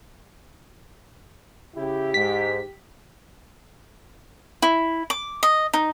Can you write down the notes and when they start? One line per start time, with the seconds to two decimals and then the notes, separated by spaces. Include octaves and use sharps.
1.75 C#3 E4 G4
2.14 G#2 B6
4.62 E4
5.10 D6
5.43 D#5
5.73 D#4